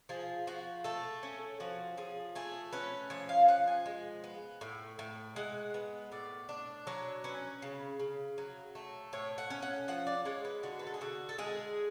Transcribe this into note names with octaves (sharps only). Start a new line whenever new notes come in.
F3 G#4
F3 F#4
A3 A4
C#4
F3 F#4
F3 G#4
A3 G#4
C#4 B4
F3 C#5
F5
F3 F#5
G#5
G#3
B3
A2
A2
G#3 F#5
B3
A2 D5
D4
F#3 C#5
C#4 B4
C#3
C#3
F#3
A3
A2 C#5
F#5
C#4
F#5
F3 F#5
D5
G#3 C#5
B4
D3 F#4
B4
A4
G#4
D3 F#4
A4
G#3 G#4